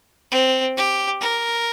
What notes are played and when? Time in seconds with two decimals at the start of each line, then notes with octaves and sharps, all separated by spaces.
0.32 C4
0.77 G4
1.21 A#4